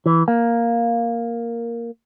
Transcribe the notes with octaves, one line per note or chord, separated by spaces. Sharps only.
E3
A#3